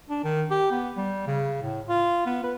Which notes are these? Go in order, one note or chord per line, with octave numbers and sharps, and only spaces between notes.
D4
D#3
G4
B3
G3
C#3
A2
F4
B3
B4